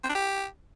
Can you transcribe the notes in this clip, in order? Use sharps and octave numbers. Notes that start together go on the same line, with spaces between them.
C4
D4
G4